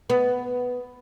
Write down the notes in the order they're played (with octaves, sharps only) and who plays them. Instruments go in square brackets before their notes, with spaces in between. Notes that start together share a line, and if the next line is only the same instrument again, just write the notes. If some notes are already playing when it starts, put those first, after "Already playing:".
[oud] B3